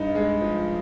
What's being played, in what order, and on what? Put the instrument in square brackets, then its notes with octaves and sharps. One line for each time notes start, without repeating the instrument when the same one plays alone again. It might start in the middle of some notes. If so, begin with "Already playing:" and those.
Already playing: [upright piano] G2 D#4
G#3
F3